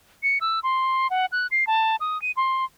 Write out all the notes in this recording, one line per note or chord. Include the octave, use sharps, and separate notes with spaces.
C#7
E6
C6
F#5
F#6
C7
A5
D#6
D#7
C6